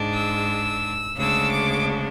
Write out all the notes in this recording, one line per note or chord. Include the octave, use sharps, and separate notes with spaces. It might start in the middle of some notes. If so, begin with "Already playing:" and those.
Already playing: G#2 G#3 D4
E6
D2 C#3 G#3 D4 E6
D6